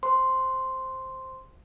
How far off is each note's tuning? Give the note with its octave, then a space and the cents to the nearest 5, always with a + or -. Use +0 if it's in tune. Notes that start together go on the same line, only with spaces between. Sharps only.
C5 +5 C6 +0